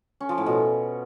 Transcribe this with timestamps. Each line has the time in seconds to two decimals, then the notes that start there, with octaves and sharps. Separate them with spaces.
0.20 C#4
0.29 F3
0.38 A2
0.46 B2